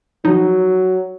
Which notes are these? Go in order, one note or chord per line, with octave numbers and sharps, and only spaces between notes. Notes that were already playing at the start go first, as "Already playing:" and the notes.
F3 F#3 D#4